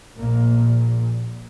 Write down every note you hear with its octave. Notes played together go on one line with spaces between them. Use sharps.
A#1 A#2 A#3